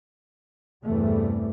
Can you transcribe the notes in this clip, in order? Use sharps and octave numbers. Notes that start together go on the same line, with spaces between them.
E2 G2 C3 E3 G3 A3